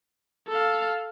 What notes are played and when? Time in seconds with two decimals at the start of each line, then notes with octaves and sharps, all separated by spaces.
0.49 A4 F5